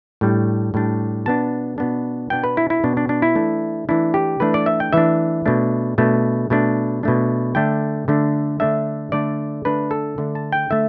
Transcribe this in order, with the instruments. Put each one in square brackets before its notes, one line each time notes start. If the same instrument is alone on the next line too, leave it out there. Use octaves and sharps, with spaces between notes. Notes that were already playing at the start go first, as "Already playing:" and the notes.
[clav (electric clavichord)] A2 G3 D4
A2 G3 D4
B2 B3 D4 A5
B2 B3 D4
B2 B3 D4 G5
B4
E4
E4
B2 B3 D4
D4
D4
E4
E3 A3 D4
E3 A3 D4 E4
G4
E3 A3 D4 B4
D5
E5
G5
E3 A3 D4 E5
B2 A3 D4
B2 A3 D4
B2 A3 D4
B2 A3 D4
D3 A3 D4 G5
D3 A3 D4
D3 A3 D4 E5
D3 A3 D4 D5
D3 A3 D4 B4
A4
D3 A3 D4
A5
G5
D3 A3 E5